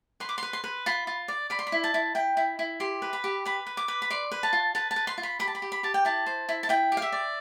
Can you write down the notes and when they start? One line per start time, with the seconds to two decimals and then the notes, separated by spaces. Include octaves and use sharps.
0.20 B4 C6
0.29 D6
0.38 B4 C6
0.53 C6
0.64 B4
0.86 F4 B5
1.07 F4
1.28 D5
1.50 D5 B5
1.59 C6
1.67 B5
1.72 E4
1.84 A5
1.94 E4
2.15 E4 G5
2.37 E4
2.59 E4
2.80 G4 C6
3.02 B4
3.13 B5
3.24 G4
3.45 B4 B5
3.67 B4
3.77 D6
3.88 B4
4.02 B5
4.10 D5 C6
4.32 B4
4.43 A5
4.53 F4
4.75 B4 A5
4.91 A5
4.96 B4
5.07 C6
5.18 F4
5.23 B5
5.39 G4 B5
5.47 A5
5.55 B5
5.62 G4
5.72 B5
5.83 G4 A5
5.94 G5
6.05 E4 A5
6.26 C5
6.49 E4
6.63 A5
6.69 E4 G5
6.92 G4
6.97 F5
7.02 E5
7.12 D5